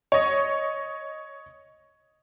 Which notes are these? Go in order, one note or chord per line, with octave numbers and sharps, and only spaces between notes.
C#5 D#5